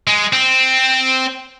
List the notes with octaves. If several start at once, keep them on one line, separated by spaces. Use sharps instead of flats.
G#3
C4